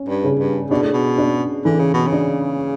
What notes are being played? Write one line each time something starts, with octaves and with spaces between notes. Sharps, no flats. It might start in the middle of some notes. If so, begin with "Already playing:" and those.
Already playing: C#4
G2
C#3
G2
B2 D4
A2
B2
D4
D3 E3
C#3
B2
C#3
D4